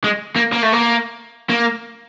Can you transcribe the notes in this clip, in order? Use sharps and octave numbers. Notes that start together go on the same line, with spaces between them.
G#3
A#3
A#3
A3
A#3
A#3